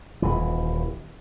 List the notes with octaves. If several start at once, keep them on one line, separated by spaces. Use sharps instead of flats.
D#1 E3